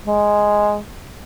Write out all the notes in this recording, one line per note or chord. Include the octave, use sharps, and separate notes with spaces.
G#3